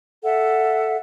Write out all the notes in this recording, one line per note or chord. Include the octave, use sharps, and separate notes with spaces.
A4 E5 F#5